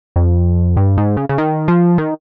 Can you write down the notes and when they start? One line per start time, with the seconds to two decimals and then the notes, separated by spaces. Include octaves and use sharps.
0.16 F2
0.77 G2
0.97 G#2
1.17 C#3
1.29 C#3
1.38 D#3
1.68 F3
1.98 D#3